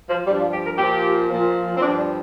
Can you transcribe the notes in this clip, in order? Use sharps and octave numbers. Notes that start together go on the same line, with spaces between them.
F3
G2 F3 G3
D4
F4
G4
A#4
A#2 F3 G4
A#2 F3
C4
G2 F3 D4
D4